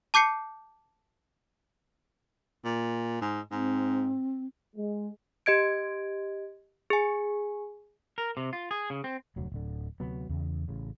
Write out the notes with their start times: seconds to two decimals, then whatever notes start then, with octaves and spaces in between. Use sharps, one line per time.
0.14 A5 D6 G6 C7 C#7
2.64 A#2
3.22 G#2
3.51 G#2 C4
4.76 G#3
5.46 G4 D#5 G#6 D7
6.90 G#4 G#5
8.18 A#4
8.37 C3
8.53 F4
8.71 G#4
8.90 C#3
9.04 C4
9.36 F1 D2 F#3
9.52 D1 D3
10.00 D2 C3 F#3 B3
10.29 E2 C#3
10.68 A1 C#3